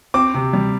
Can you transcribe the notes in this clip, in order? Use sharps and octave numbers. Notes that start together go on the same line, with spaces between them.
C4 D6
C3
G3